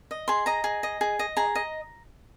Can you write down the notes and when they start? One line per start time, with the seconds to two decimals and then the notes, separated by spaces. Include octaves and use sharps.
0.11 D#5
0.28 G#4 C6
0.46 D#5 A#5
0.64 G#4
0.83 D#5
1.01 G#4
1.19 D#5
1.37 G#4 A#5
1.55 D#5